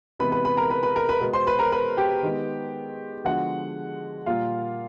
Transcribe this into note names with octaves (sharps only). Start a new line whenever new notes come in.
C3 E3 G#3 B3 B4 B5
B4 B5
B4 B5
A#4 A#5
B4 B5
B4 B5
A#4 A#5
B4 B5
B2 G#3 B3
C5 C6
B4 B5
A#4 A#5
B4 B5
G4 G5
D#3 G#3 B3
D3 F3 G#3 B3 F#4 F#5
A#2 G3 A#3 F4 F5